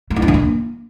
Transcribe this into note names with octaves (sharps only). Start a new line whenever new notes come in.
A3
E4
D4
E3
A#3